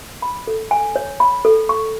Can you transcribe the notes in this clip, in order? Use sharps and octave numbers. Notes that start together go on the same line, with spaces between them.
B5
A4
G#5
C#5
B5
A4
C#6